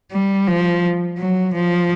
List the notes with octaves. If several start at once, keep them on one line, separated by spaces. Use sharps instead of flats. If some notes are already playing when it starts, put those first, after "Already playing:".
G3
F3
F#3
F3